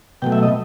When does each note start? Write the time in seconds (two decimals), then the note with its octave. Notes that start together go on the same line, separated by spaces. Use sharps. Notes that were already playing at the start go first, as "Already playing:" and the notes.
0.22 B2 F#3 A3 G5
0.32 E5
0.43 D#5